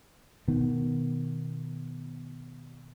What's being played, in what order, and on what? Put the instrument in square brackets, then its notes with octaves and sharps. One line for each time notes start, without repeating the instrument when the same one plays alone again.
[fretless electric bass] B2 D#3 B3